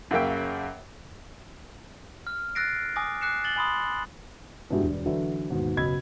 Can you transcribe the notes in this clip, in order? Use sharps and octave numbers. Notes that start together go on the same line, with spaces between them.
F#2 C#3 A#3 E5 G5
F6
E6 F#6 A6 A#6 C7 D7
G#5 D6 D#6 A#6
D6 F#6 C7 C#7 E7
A6 F#7 G7
G#5 B5 C6 D#6 E6
G2 B2 G#3 E4 F#4 G4
E1
D3 E3 F#3 E4
D#2 G#2 B2
F#1 B2 D#5 B5 E6 G#6